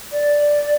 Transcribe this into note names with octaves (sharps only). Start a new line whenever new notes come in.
D5